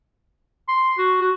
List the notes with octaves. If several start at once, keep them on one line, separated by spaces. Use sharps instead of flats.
C6
F#4
F#4